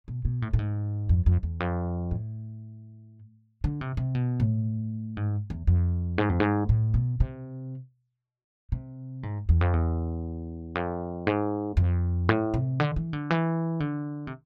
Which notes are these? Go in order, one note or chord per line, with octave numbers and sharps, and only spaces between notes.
B2
B2
A2
A2
G#2
F2
F2
E2
F2
A2
D3
C3
C3
B2
A2
G#2
E2
F2
G#2
F2
G#2
A2
B2
C3
C3
G#2
E2
F2
E2
F2
G#2
F2
A2
C3
D3
E3
D3
E3
D3
C3